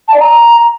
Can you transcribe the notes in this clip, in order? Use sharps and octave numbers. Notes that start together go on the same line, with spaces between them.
A5
D5
A#5